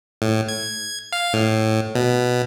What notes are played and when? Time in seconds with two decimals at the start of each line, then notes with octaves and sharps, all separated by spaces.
0.22 A2
0.48 G#6
1.12 F5
1.33 A2
1.95 B2